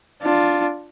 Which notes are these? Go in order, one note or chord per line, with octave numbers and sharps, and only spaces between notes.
D4 F4